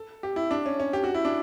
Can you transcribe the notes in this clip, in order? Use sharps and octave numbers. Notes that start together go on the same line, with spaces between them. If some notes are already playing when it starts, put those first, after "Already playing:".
Already playing: A4
G4
E4
D4
C#4
C#4
G4
F#4
E4
D4